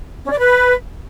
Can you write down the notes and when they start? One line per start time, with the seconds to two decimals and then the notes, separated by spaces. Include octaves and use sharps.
0.24 C#4
0.31 D5
0.38 B4